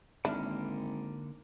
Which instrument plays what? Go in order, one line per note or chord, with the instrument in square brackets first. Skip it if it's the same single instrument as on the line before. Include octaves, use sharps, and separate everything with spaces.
[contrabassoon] G#1 [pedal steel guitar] D3 A#3 F6 [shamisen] D4 E4